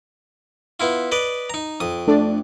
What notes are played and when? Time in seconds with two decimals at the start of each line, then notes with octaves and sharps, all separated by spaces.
0.80 B3 E4 F4
1.12 B4 D5 D#5
1.50 D#4 A#5
1.80 F2 D#6
2.07 A3 D4 D5